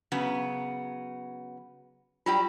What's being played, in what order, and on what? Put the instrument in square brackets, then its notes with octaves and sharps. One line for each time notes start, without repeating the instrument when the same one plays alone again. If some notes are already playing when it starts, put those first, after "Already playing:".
[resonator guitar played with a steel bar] C#3 F#3 B3
[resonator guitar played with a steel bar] F#3 G3 G5 [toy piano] F4